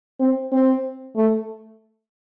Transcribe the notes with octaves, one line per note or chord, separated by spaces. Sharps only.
C4
C4
A3